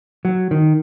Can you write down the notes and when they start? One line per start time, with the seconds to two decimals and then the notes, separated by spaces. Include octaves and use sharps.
0.25 F#3
0.51 D#3